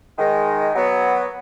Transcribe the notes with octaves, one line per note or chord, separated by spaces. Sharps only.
D#3 G#3
F#3 B3